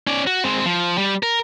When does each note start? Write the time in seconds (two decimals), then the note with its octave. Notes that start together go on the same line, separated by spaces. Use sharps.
0.07 C#4 D5
0.27 F#4
0.44 G#3 C4
0.66 F3
0.98 G3
1.23 A#4